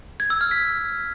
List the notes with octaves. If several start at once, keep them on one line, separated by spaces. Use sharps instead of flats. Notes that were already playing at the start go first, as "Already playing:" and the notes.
G#6
E6
F6
B6